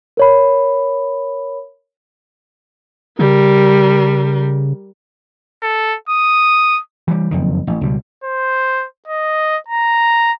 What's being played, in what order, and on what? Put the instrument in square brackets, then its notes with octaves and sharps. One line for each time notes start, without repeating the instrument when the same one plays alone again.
[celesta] A#4 C#5 B5
[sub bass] C#3 [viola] G3 A#4
[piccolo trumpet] A4
D#6
[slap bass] E3 G3
F#1 F2 D#3
A1
C#2 B2 F#3 G3
[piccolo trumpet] C5
D#5
A#5